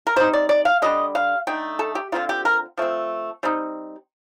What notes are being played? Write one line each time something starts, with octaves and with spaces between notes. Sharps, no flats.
A#4
G3 C4 D#4 C5
D5
D5
F5
D3 G3 D4 D#5
F5
D3 A3 D#4 G5
A4
G4
D3 F3 C4 D#4 F4
G4
A#4
F3 A3 C4
G3 C4 D#4